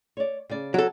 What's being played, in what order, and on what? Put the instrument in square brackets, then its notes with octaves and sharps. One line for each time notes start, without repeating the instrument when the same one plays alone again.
[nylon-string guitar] C#5 D5
C#3 D5
[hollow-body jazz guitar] F#3 A4